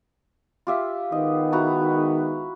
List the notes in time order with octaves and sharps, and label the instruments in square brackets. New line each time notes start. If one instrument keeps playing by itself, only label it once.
[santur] F4 G4 E5
[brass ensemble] D#3 G#3 B3 [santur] D#5
[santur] E4 F#4 A#5